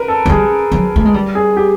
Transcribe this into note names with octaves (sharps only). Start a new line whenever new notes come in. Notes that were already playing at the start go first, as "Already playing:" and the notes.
Already playing: A#4 B4
A4
F#3
G3 G#4
F#3
A3
G#3
G3
G#4
G4